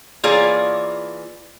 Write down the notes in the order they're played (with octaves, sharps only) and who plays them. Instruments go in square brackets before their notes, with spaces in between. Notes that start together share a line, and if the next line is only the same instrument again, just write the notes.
[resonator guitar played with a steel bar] E3 A#3 F4 G#4 C#5 D5